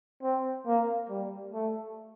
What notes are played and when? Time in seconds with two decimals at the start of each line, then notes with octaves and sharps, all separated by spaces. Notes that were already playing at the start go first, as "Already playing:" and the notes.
0.23 C4
0.67 A#3
1.09 G3
1.54 A3